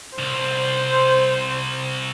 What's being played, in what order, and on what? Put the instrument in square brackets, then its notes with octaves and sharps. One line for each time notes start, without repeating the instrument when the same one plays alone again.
[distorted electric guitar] C2 [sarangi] C5